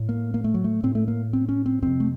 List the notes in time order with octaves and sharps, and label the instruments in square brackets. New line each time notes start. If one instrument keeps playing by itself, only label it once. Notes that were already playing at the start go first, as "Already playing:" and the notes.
Already playing: [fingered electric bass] A2
A#3
A#3
A3
F#3
A3
A2 C4
A3
A#3
C4
C#4
C4
F2 C3 C4
A3